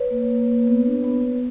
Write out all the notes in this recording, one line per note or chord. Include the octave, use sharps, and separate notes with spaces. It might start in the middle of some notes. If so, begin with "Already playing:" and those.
Already playing: B4 C#5
A#3
A#3
A#3
B3
D4
B3
B3